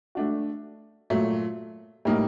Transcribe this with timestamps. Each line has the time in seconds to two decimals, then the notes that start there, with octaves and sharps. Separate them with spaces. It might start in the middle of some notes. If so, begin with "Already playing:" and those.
0.15 A3 D4 F#4
1.10 A#2 F#3 A3
2.05 A2 G3 A#3 D#4